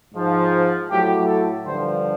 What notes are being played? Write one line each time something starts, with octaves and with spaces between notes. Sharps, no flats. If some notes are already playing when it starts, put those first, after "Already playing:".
G#2 F3
A2 F#3 G4
A4
G2 D3 F3 C5